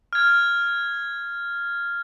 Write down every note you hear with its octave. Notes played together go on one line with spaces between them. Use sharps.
F6 G#6